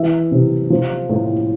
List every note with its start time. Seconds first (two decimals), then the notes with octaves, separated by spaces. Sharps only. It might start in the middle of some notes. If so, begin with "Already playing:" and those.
Already playing: E3 E5
0.31 C3
0.70 F3
1.09 A2